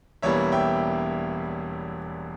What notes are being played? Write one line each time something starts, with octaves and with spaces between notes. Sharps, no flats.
E1 E2 E3 G3 A#3 C#5 E5
E5 G5